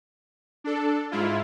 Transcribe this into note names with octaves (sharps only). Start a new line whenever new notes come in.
D4 A4
G#2 E4 F4